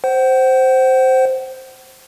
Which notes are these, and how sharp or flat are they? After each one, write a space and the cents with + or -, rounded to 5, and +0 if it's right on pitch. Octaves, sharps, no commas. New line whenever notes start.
C5 +0 F#5 +40